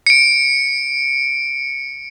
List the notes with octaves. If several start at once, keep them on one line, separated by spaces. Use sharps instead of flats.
C#7 D7